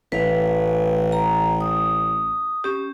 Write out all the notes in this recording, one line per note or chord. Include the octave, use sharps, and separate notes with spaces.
A1 B4 F5
A#5
D#6
C#4 G4